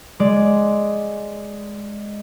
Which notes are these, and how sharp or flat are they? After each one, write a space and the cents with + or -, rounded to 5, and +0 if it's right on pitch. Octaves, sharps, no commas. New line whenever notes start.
G#3 +0 D5 +0